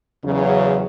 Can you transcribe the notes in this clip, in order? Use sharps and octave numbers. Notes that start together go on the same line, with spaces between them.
E2 C#3 F#3